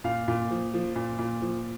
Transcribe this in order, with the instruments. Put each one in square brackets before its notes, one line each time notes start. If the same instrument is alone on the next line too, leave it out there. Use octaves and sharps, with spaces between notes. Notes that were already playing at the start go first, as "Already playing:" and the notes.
[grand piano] A#2 F5
A#2
F3
F3
A#2
A#2
F3